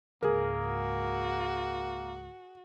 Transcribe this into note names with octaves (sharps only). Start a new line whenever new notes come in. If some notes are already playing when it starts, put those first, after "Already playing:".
C#2 G#2 A#3 G#4 A#4
F#4